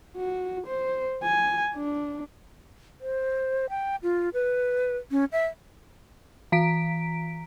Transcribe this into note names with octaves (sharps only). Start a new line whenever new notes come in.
F#4
C5
G#5
D4
C5
G5
F4
B4
C#4
E5
E3 A#5 B6 D7